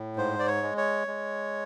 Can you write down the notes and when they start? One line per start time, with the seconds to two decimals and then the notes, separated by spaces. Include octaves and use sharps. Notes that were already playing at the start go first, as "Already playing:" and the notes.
Already playing: A2
0.17 G#2 C5
0.39 D5
0.47 C#5
0.63 G#3
0.78 C#5
1.07 G#3